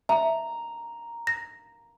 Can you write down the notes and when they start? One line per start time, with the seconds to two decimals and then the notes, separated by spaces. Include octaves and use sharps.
0.09 E5 A#5
1.27 A#6